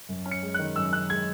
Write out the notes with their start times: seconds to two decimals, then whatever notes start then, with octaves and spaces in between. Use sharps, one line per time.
0.09 F#2
0.26 C#4
0.31 C#7
0.43 G#3
0.54 F#6
0.59 D#3
0.76 F#2 E6
0.93 C#4 F#6
1.10 G#3 G#6